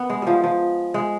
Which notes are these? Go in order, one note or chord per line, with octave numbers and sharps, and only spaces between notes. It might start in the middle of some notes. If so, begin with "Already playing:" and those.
Already playing: B3
G#3
F3 G3
F3
G#3